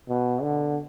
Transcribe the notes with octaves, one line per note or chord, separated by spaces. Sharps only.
B2
D3